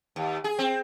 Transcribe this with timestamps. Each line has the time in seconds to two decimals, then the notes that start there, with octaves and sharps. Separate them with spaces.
0.16 D#2
0.44 G#4
0.59 C4